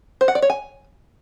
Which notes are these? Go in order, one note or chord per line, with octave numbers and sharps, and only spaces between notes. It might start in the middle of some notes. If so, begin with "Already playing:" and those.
C5
F#5
D5
C#5
G#5